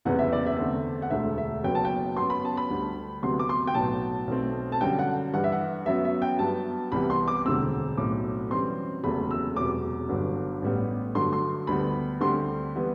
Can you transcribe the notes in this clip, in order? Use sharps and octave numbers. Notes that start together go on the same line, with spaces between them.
F#1 E2 C3 E3 F#5
E5
D5
E5
E2 D3 A3 C4
F#5
E1 D2 D3 A3 E5
E5
F#1 F#2 F#3 B3 G5
A5
G5
F#2 F#3 B3 C6
B5
A5
B5
D2 D3 G3
D2 C3 F#3 B3 C6
D6
C6
G5
B1 A2 F#3 B3 A5
B1 B2 A3 C4
A5
F#2 D3 G3 G5
F#5
G2 E3 G3 F#5
E5
F#5
F#2 F#3 B3 E5
E5
G5
G2 F#3 B3 A5
C2 C3 E3 G3 B3 B5
C6
D6
E1 D2 D3 G3 C4 E6
B1 A2 F#3 C4 D6
F#2 E3 G3 C4 C6
F#1 E2 C3 F#3 A3 B5
E6
E1 E2 C3 F#3 D6
G1 G2 D3 F#3
A1 A2 G3 B3
G2 D3 F#3 A3 C6
C6
D2 D3 G3 B3 B5
D2 D3 G3 C4 C6
E3 G3 B3